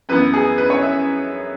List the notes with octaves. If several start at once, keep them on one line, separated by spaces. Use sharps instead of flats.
F#2 E3 B3 B4
G#4
B4
C#5
E5